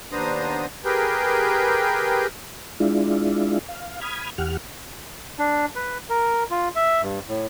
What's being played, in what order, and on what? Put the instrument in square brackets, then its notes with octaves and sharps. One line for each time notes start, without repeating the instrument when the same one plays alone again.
[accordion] D#2 B3 D4 C5 A#5 D#6
G4 G#4 A#4 B4 G5
[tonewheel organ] G#3 D4 E4 F4
F5
B5 D#6 F6 G#6
E2 G4 F#5 F6
[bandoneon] D4
B4
A#4
F4
E5
G2
A2